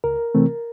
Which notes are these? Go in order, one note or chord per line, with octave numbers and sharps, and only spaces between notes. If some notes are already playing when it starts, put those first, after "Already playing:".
C#2 A#4
C3 E3 A3 C4